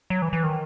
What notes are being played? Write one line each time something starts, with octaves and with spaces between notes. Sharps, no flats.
F#3
E3
E3
D#3